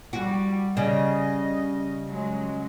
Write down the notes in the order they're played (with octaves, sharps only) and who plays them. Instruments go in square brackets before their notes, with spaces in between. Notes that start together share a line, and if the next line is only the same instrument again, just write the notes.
[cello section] G3 [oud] F#4
[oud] C#3 G3 [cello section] D#5
[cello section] F#3 G#3